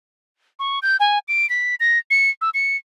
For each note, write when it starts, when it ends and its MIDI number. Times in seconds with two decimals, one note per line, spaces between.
0.59 0.79 85
0.82 0.97 91
1.00 1.19 80
1.28 1.48 98
1.50 1.75 95
1.80 1.99 94
2.10 2.30 97
2.41 2.50 88
2.54 2.77 97